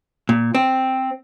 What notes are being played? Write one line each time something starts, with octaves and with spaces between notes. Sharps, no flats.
A#2
C4